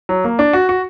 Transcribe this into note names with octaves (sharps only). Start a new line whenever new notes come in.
F#3
A#3
D4
F#4
F#4